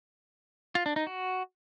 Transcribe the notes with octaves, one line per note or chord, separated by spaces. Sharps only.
F4
D4
D#4
F#4